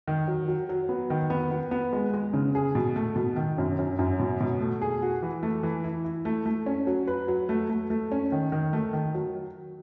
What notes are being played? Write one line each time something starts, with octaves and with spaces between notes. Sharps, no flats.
D#3
F#3
F#3
F#3
B3
D#3
B3
B3
B3
G#3
G#3
C#3
G#4
B2
A3
B2
D#3
F#2
F#2
F#2
B2
B2
A3
G#4
F#4
E3
A3
E3
E4
E4
A3
A3
C#4
F#3
B4
F#3
A3
A3
A3
C#4
D#3
D#3
A3
D#3
F#3